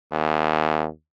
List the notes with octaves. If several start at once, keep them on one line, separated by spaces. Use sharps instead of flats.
D#2